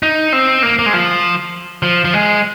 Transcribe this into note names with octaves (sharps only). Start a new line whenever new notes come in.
D#4
C4
A#3
A#3
G#3
F3
F3
F3
G#3